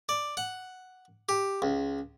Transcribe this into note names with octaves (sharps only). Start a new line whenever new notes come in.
D5
F#5
G4
C#2